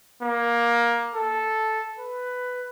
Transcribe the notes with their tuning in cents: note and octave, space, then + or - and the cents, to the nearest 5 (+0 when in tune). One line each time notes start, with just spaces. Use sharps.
A#3 +15
A4 -5
B4 +10